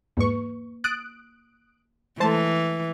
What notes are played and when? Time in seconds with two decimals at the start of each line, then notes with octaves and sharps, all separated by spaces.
0.17 E2 G#2 A#3 B4 C#6
0.84 D#6 F#6 A6 D7
2.20 E3 G#3 A3 A4 C5 A5